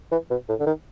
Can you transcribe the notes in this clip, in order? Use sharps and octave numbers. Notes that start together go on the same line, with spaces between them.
E3
B2
A2
D3
D#3